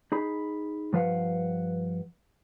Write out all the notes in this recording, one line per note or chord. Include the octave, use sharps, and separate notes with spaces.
D#4 G#4 B5
G2 F3 B4 F5 F#5